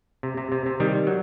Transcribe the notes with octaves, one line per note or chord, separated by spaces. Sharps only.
C3
C3
C3
C3
D#3 G3
F#3